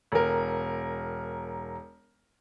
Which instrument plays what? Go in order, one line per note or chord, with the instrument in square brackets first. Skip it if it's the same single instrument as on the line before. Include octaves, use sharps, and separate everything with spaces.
[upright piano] E1 A#4